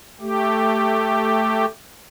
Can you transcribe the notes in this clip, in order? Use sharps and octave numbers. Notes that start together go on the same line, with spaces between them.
A3 G4